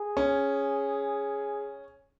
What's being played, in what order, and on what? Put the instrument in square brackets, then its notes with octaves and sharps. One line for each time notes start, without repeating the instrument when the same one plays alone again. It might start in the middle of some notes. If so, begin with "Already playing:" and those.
Already playing: [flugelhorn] G#4
[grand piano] C#4